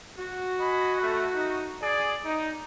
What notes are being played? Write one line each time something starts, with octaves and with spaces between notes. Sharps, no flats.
F#4
D#5 G#5 B5
A3
D#4
G#4 D5
D#4